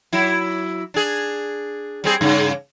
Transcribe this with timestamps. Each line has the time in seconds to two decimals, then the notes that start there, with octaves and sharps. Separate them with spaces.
0.13 F#3 E4
0.94 D4 G#4
2.04 G3 C4 G#4
2.21 G2 C#3